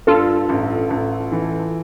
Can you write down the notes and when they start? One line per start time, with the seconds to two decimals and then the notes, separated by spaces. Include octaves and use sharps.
0.07 G2 F4 A4
0.49 A1
0.90 A1
1.32 E3